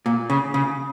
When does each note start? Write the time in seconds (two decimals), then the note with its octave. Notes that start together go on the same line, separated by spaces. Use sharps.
0.06 A#2
0.30 C#3
0.54 C#3